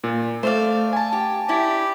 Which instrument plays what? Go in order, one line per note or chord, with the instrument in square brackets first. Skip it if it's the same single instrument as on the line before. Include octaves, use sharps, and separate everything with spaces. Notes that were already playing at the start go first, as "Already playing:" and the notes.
[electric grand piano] A#2
[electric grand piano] A3 [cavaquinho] C5 D5 F5
[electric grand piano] G#5 A5
[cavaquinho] G4
[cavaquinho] E4 D5 [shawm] G4